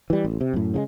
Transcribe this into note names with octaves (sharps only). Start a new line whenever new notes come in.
E3 G3
A1
C3
F#2 A2
C#3 F3 G#3